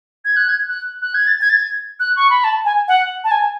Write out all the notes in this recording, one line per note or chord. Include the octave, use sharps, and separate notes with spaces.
G#6
F#6
G#6
F#6
F#6
G#6
A6
G#6
A6
G#6
F#6
C#6
B5
A5
G#5
F#5
A5
G#5